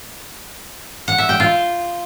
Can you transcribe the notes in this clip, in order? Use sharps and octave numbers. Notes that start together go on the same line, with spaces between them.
F#5
E5
G5
F4